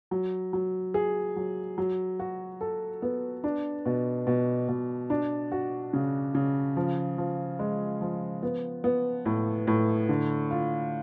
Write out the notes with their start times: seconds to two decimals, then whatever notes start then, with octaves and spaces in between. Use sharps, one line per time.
0.11 F#3
0.53 F#3
0.94 G#4
1.36 F#3
1.78 F#3
2.19 F#4
2.61 A4
3.02 B3
3.44 D4
3.86 B2
4.27 B2
4.69 B2
5.10 D4
5.52 F#4
5.93 C#3
6.35 C#3
6.77 F3
7.18 F3
7.59 G#3
8.01 F3
8.43 B3
8.84 B3
9.26 A2
9.67 A2
10.09 D3
10.50 F4